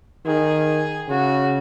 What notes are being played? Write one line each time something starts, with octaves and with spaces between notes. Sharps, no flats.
D#3 G#4
C#3 F#4